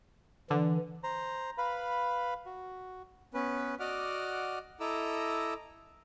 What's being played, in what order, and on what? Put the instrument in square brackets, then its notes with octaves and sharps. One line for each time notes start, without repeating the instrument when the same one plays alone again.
[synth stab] D3 [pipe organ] E3
[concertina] C5 A#5
B4 F5 B5
F#4
[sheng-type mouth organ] B3 C#4 B4
F#4 D5 D#5 F#5 D6 F6
E4 A4 D#5 A#5 D6 E6